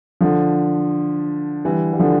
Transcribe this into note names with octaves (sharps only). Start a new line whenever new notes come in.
D3 F3
E3 G3
G3
D3 F3